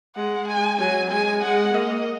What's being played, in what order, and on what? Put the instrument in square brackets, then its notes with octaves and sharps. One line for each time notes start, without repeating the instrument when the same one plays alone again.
[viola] G#3 [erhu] F#5
[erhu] G#5
[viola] F#3 [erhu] G#5
[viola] G#3 [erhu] G#5
[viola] G#3 [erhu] F#5
[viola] A#3 [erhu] D#5